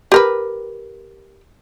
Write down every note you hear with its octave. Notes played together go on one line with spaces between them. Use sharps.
G4 A#4 B4